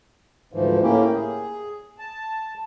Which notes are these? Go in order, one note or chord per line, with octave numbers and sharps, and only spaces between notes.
D2 G#2 E3 F3
A2 A#3 C#4 E4 G4
G#4
A5